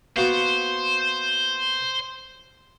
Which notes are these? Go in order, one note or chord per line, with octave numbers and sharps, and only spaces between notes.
A#3 B3 F#4 C5